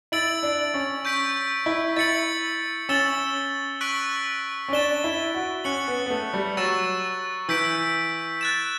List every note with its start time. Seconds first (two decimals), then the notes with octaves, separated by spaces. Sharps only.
0.12 E4 E6 A6 D7 F#7
0.43 D4
0.74 C#4
1.05 C#6 G6 B6 D7
1.66 E4
1.96 E4 A6 C#7 F#7
2.89 C#4 E6 A6 E7 G7
3.81 C#6 F#6 B6 D7 F#7
4.68 C#4
4.73 D4 A6 E7 G7
5.04 E4
5.34 F#4
5.64 C#4 F#6 C#7 F#7
5.88 B3
6.06 B3
6.10 A3
6.34 G3
6.57 F#3 C#6 E6 A6 E7
7.48 E3 E6 G6 B6 D7
8.41 F#6 A6 E7